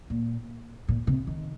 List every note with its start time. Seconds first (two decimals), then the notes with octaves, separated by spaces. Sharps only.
0.10 A#2
0.88 A#2
1.07 C3
1.27 D#3